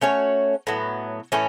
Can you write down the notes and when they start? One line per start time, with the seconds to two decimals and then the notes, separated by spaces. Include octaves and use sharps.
0.01 A3 C#4 F#4 C#5
0.67 A2 F#3 B3
1.32 A2 E3 A3 C#4